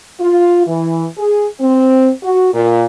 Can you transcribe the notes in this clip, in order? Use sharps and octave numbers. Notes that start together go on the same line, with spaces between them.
F4
E3
G#4
C4
F#4
A#2